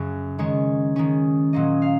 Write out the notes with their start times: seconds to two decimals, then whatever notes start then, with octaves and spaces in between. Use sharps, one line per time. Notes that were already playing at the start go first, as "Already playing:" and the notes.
Already playing: F#2 C#3 F#3 C#4
0.38 D#3 G#3 C#4 C#5
0.96 D#3 G#3 C#4
1.53 A#2 F#3 A#3 C#4 D#5
1.82 F5